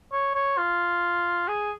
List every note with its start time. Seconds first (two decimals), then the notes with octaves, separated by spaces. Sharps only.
0.13 C#5
0.35 C#5
0.58 F4
1.48 G#4